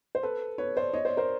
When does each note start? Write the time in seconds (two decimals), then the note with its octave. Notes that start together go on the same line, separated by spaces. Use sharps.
0.15 C5
0.23 A4 B4
0.58 B4 C#5
0.76 C5 D5
0.94 C#5 D#5
1.05 C5 D5
1.17 A#4 C5